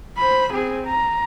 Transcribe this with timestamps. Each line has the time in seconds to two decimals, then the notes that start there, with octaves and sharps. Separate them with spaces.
0.18 C5 B5
0.53 C4 G#4
0.87 A#5